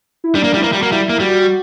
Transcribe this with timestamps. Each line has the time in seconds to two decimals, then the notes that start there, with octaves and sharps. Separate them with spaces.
0.24 E4
0.35 G3 D4
0.44 A#3
0.54 G3 E4
0.63 A#3
0.73 G3 F#4
0.83 A#3
0.92 G3 E4
1.06 A#3 E4
1.20 G3 F#4
1.42 F#4